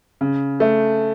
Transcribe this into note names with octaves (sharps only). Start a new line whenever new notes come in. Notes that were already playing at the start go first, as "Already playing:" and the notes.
C#3
A3